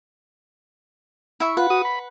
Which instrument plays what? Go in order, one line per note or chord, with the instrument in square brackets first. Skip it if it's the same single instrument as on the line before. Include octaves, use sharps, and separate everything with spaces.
[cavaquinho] E4 E5 C#6
[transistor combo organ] F4 [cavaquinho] B4 F#5
[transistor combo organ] F#4 D#6
B5